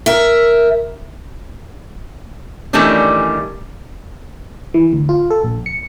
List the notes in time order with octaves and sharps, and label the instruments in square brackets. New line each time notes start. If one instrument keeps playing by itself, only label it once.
[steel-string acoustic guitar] A#4 E5
[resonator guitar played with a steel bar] D#3 E3 G3 A3 C#4 D4
[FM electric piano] E3
D2
F4
A4
A#1
C#7